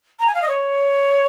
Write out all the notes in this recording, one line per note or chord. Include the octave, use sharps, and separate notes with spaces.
A#5
G#5
F5
D#5
C#5